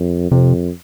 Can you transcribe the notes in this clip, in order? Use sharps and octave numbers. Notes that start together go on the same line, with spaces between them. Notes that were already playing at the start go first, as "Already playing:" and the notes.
Already playing: F2
F2 C3